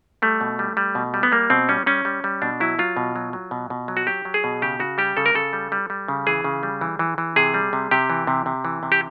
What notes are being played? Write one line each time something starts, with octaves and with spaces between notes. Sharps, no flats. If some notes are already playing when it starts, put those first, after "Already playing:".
G3 A3
B2
G3
G3
B2
G3
B3
G3 A#3
B2 C4
G3 C#4
G3 C#4
G3
G3
B2 D4
F#3 E4
F#3 F4
B2
F#3
F#3
B2
B2
F#3
F#4
F#3 G4
F#3
G#4
B2
C#3 G4
C#3 F#4
G3 G4
C#3 A4
A#4
C#3 A4
G3
G3
G3
C#3
E3 G#4
C#3
G3
E3
E3
E3
C3 G#4
G3
C3
C3 G4
E3
C3
C3
E3
C3
G4